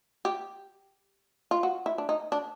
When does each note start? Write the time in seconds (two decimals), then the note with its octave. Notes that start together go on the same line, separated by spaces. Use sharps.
0.25 G4
1.51 F4
1.63 F#4
1.86 E4
1.98 D4
2.09 D#4
2.32 D4